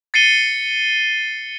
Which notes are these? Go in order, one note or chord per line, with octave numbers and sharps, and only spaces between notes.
A6 C7 C#7 D#7 G7